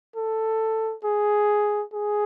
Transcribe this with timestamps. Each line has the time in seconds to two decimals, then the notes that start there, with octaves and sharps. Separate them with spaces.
0.16 A4
1.05 G#4
1.94 G#4